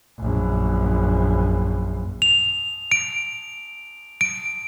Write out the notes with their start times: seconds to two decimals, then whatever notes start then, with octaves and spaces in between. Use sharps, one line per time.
0.19 A#1 F#2
2.22 F7
2.92 D7
4.21 D7